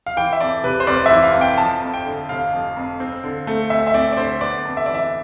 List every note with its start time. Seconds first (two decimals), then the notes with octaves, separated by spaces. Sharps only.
0.06 F5
0.17 E3 G5
0.33 E5
0.40 F2 D5
0.63 C3 B4
0.80 C5
0.87 F1 D5
1.06 E3 E5
1.23 F5
1.35 F2
1.41 G5
1.58 F3 A5
1.82 F2
1.94 G5
2.06 D3
2.29 F1 F5
2.53 F3
2.77 F2
3.00 C4
3.24 D3
3.47 A3
3.70 D2 E5
3.87 E5
3.94 C4 D5
4.12 D5
4.17 D3 C5
4.41 B3 D5
4.65 F2
4.77 E5
4.86 E3 D5
4.94 E5